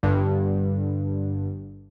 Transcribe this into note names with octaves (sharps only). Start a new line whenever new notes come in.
G1 G2 D3